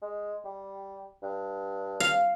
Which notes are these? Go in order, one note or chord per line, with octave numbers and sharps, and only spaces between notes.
G#3
G3
G2
F5